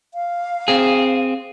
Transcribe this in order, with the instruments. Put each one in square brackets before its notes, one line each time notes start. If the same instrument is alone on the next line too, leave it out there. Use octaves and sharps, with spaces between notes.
[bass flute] F5
[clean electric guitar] C4 G#4